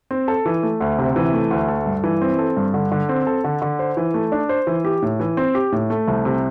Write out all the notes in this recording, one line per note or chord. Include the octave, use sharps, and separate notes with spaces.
C4
A4
E3
A3
D2
C3
E3
A3
D2
A4
G2
E3
C4
A4
G2
D3
D3
C4
A4
D3
D3
C5
E3
A3
D4
C5
E3
G4
A2
E3
C4
G4
A2
A3
C2
C3